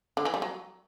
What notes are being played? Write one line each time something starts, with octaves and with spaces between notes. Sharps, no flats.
D3
E3
G3
F#3